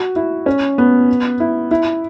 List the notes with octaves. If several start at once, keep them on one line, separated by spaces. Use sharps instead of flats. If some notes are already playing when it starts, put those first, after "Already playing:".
Already playing: F#4
E4
C#4
B3
E4
E4